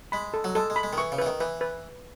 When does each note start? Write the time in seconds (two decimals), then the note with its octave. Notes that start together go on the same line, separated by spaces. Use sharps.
0.12 G#3 B5
0.34 A4
0.44 F#3
0.55 G#3 A4
0.70 G#3
0.76 B5
0.83 G#3
0.93 D#3
0.98 E3 C#6
1.12 C#3
1.18 E3 B4
1.26 D#3
1.41 E3 B4
1.61 B4